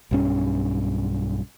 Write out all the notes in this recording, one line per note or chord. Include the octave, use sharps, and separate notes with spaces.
B1 G2 C#4